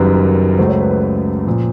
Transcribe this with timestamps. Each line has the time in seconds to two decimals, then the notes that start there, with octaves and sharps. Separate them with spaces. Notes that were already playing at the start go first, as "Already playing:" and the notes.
Already playing: F#1 F#2 D#3 G3 A#4 B4
0.14 B4
0.58 C#2 C#3 F#3 A3 C5
0.69 C#5
0.81 B4
0.91 B4
1.02 B4
1.47 A#2 F3